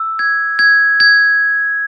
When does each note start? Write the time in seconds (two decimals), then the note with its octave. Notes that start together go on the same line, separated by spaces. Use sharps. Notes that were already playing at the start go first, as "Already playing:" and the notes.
Already playing: E6
0.19 G#6
0.59 G#6
1.00 G#6